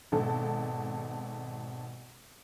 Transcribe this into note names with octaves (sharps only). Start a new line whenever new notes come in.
G#1 B2 A4